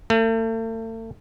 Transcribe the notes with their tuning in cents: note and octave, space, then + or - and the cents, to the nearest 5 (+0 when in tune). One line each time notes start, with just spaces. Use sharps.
A3 +40